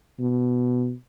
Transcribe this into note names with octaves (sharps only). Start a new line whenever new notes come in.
B2